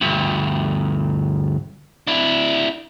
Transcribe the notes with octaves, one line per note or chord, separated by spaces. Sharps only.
D2 G2
D4 E4